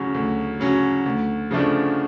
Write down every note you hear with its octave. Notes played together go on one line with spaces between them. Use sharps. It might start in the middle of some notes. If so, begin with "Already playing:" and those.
Already playing: D2 C#3 F#3 C#4
D2
C#3 F#3 C#4
D2
C#3 F3 A3 D4